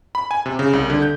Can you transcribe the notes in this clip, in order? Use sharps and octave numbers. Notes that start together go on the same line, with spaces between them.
B5
G#5
C3
C#3
C2
D3
G6